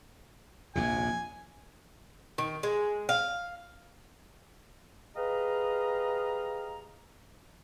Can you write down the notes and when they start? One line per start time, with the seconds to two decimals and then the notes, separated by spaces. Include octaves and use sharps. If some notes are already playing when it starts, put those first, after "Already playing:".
0.76 A#1 D#2 C3 G#5
2.38 D#3
2.63 G#3
3.09 F5
5.15 G4 G#4 B4 D#5 F5 A#5